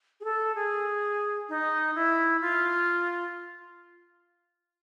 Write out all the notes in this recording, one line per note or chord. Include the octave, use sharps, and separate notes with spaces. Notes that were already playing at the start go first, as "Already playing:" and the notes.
G#4
A4
G#4
D#4
E4
F4